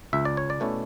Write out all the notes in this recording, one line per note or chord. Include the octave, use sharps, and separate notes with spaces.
C#2 E5
D5
C#5
D5
B2 A3 C#4 E4